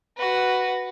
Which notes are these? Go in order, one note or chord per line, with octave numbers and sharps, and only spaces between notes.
F#4 B4